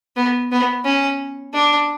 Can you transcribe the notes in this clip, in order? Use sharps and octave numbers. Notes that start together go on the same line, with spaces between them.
B3
B3
C#4
D4